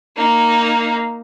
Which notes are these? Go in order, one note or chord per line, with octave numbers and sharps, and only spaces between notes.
A#3 D#4